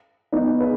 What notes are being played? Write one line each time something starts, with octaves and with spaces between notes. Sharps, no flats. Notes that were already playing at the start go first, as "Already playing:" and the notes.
B3 D#4
G#4 B4